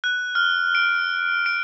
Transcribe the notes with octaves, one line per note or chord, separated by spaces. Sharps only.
F#6
F6
D7
D7